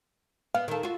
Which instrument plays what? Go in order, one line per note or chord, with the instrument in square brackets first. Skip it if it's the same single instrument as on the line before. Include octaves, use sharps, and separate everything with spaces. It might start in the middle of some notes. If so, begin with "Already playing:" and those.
[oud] B3 [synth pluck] F5
[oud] D#3 A4
F4 F#4